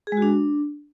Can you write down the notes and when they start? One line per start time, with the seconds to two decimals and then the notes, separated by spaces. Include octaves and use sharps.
0.07 G#4
0.12 G#3
0.17 F#4
0.22 D4